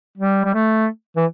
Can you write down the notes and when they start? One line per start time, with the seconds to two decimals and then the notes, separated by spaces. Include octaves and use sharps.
0.18 G3
0.44 G3
0.54 A3
1.16 E3